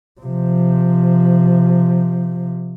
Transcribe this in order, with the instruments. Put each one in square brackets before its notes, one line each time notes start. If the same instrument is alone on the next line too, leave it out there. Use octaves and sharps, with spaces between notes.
[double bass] C3 F3